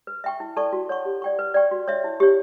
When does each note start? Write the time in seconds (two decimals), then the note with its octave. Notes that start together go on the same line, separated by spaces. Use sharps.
0.07 B4
0.24 E5 G5 C#6
0.40 E4
0.57 A4 D5 A5 C#6
0.73 F#4
0.89 C#5 F#5 C#6
1.05 G4
1.22 D5 G5 C#6
1.39 B4
1.54 D5 G5 C#6
1.71 F#4
1.88 C#5 E5
2.04 E4
2.20 G4 C#5